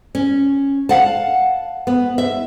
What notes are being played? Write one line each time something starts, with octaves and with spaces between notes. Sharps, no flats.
C#4
F5 F#5 A5
B3
E5